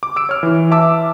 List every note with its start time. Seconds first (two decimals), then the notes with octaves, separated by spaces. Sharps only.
0.03 D6
0.16 E6 D7
0.29 C#5 F6
0.43 E3
0.71 E5 A5 D6 E6